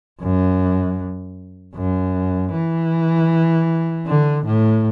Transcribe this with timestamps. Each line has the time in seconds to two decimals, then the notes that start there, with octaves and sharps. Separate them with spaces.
0.21 F#2
1.75 F#2
2.53 E3
4.07 D3
4.46 A2